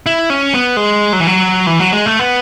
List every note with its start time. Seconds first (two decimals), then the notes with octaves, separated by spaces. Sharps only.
0.06 E4
0.30 C#4
0.54 B3
0.77 G#3
1.13 F#3
1.20 E3
1.27 F#3
1.67 E3
1.79 F#3
1.93 G#3
2.06 A3
2.19 B3